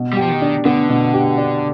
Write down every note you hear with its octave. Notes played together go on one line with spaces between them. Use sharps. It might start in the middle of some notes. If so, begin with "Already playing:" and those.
Already playing: B2
G3
F3 G4
D#3
D4
D3 B3
B2
G4
D4